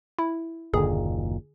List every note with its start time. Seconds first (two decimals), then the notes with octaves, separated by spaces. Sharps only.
0.19 E4
0.74 F#1 D#2 A#2 D3 G#4